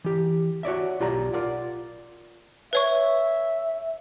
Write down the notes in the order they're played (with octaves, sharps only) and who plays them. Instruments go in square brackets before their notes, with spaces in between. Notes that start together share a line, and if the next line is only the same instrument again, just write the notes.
[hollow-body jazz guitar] E3 G4
F#4 C#5 D5 E5
B1 F4 G4 D5 A#5
F4 A#4 D5 F#5
[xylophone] B4 C#5 C#6 [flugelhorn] E5